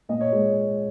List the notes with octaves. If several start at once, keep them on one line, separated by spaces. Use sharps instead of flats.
A#2 D#5
C#5
G#3